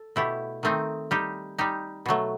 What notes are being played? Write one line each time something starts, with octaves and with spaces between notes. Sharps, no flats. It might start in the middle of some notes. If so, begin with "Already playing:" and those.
Already playing: A4
B2 A3 E4 G4
D#3 A3 C4 D#4
G3 D#4 G4
G3 D#4 G4
B2 F#3 A3